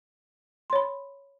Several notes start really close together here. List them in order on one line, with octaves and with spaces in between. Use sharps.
C6 C#5 B5